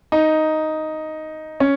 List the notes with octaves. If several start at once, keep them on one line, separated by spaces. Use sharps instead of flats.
D#4
C#4